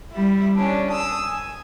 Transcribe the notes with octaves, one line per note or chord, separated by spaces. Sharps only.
G3 E4
C#4 D4
D#6 E6
G#5